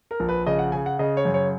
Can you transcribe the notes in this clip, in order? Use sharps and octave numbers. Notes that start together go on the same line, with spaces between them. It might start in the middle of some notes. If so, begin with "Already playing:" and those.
A#4
A#1
B4
C#3 D#5
F#5
C#3 G#5
F#5
C#3 D#5
C#5
F#2
C#5